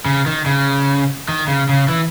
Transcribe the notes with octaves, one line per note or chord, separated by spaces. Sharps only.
C#3
D#3
C#3
D#3
C#3
C#3
E3